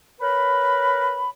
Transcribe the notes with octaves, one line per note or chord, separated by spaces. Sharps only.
A#4 B4 C#5 B5